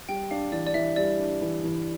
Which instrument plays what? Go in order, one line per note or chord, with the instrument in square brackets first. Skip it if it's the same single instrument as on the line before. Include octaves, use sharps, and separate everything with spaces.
[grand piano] G3 [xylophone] G5
[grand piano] D4 [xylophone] F5
[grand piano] E3 [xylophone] D5
[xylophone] D5
[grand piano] E3 [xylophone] E5
[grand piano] G3 [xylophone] D5
[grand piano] D4
E3
E3